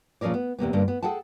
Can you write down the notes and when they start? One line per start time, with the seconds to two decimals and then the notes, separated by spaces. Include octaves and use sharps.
0.21 A#2 F3 C#4 G#4 A#4 D5
0.34 B3
0.59 E2 C3 A#3 B3
0.73 G2 D3 A#3
0.88 B3
1.03 G#4 A4 F#5 G5 A5